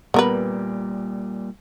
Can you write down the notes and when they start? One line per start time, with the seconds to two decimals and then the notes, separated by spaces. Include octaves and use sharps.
0.14 A#2 G3 B3 A#4 B4